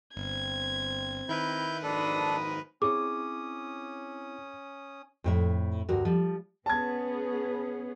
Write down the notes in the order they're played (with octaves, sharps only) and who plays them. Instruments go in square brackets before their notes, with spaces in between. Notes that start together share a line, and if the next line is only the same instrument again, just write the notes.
[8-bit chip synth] G1 [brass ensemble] C4 [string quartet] G#6
[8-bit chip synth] D#3 A#4 B4 [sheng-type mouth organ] E4 G6
[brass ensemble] F#1 F2 G#2 [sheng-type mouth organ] D4 A4 [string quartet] B5 D#6
[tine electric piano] C4 E4 C#5 [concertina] C#4 D#6 [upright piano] G#4 [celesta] D6
[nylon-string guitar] F2 A2 E5
D2 G2 F#4 A#4
F3 G3
[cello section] B3 C#4 G#4 [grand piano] A5 G#6